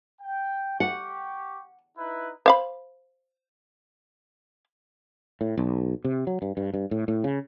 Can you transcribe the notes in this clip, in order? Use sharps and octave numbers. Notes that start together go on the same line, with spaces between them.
G5
G4 F#5 C#6
D#4 E4 B4
C5 F5 B5
A2
B1
C3
F#3
G2
G2
G2
A2
A2
C#3